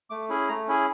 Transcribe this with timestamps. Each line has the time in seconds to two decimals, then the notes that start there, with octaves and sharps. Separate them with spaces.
0.10 A3 D6
0.29 C#4 E4 G#4
0.49 A3 A#5
0.68 C#4 E4 G#4